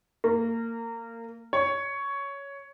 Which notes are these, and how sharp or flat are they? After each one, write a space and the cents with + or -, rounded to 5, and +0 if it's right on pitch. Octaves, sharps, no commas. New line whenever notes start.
A#3 -20
C#5 +10